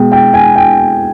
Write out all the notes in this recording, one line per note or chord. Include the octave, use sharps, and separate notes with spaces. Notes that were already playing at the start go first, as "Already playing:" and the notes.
Already playing: B2 G#3 G5
G5
G#5
G5